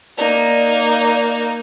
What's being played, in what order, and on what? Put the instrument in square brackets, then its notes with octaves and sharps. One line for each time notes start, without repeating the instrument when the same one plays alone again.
[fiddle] A#3 D#4 [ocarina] D5